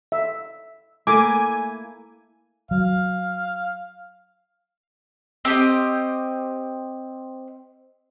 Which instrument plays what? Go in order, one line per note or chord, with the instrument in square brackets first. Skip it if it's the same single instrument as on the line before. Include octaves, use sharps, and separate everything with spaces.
[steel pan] E5
[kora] A3 A#3 E4 [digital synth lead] G#5 [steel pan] D6
[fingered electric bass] F#3 [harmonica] F5
[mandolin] C4 G4 D#5